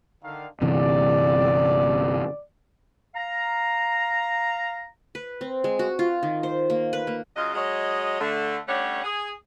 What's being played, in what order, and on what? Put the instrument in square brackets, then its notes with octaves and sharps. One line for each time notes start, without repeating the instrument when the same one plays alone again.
[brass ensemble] D3 D#3 F5
[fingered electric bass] G1 C3 E3 [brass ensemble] D5
[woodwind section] F5 A#5
[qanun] B4
C4
G#3
F#4
F4
D#3
C5
A#3
B4
A#3
[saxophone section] C#3 F#3 F4 D#5
F#3 G#3 C#5 D#5
D3 A3
G3 A3 C#4 D4 C#5 F#5
G#4